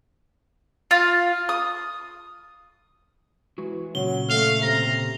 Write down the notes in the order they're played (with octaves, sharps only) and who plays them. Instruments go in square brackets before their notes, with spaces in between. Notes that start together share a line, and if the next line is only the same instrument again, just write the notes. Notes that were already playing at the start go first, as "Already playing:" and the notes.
[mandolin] F4
D#6
[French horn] E3 [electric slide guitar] G#3 F#4
[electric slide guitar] A#2 C#3 [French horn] F#3 [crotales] G7
[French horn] A3 [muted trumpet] F5 [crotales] F7
[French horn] C3 [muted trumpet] A#5